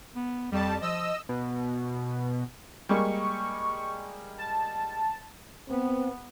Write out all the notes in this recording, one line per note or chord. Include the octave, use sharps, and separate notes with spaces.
B3
F2 G3 A5
F3 D#5 E6
B2
G3 G#3 A#3 C#6
A5
B3 C4